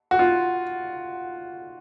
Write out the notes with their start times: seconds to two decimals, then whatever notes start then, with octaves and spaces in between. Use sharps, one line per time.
0.11 F#4
0.19 F4